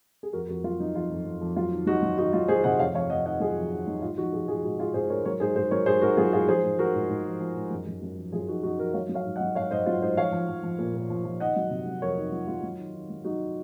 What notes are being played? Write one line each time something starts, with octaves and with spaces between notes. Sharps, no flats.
G#4
F2 F#4 A#4
F2 F#4 A#4
F#3 F4
F#3 D#4
F2 F4
F2
F2
F2
F#3 F4
D#3
F#3 D#4 F#4
F#3
D#3 D#4 F#4
F#3 F4
F#3 G#4 C5
C3 D#5 F#5
F2 C#5 F5
F2 C#5 F5
F2 D#5 F#5
D#3 D#5 F#5
F#3 F4 G#4
F2
D#3
F#3 D#4
G#2 F4
F3 D#4 F#4
F3 F4 G#4
F3 F4 G#4
G#2 D#4 F#4
G#2 F4 G#4
G#2 G#4 C5
G#2 A#4 C#5
F#3 A#4 C#5
G#2 G#4 C5
G#2 G#4 C5
F#3 A#4 C#5
G#2 G#4 C5
G#2 F#4 A#4
F#3 F4 G#4
G#2 F4 G#4
F3 G#4 C5
G#2
F3 F#4 A#4
G#2
G#2
F3
F3
G#2
F#2
F#2
F#2
F3
F#2 F4 G#4
F3 D#4 F#4
F#2 D#4 F#4
F3 F#4 A#4
F#3 C#5 F5
F#3
C#5 F5
G#2
D#5 F#5
F#3
G#2 C#5 F5
G#2 C5 D#5
F#3 F4
G#2 C5 D#5
F3 C#5 F5
F3
F3
F3
A#2
A#2
F3
F3
D#3 D#5 F#5
F#3
C3
F#3
F2 A#4 C#5
D#3 D#4
F#3 F4
F#3 F4
F#3
D#3
D#3
F#3
F#3 D#4 F#4